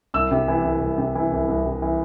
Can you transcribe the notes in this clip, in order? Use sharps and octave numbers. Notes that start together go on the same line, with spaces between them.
C2 E6
C3
E3
C2
C2
C3
E3
C2
C2
C3
E3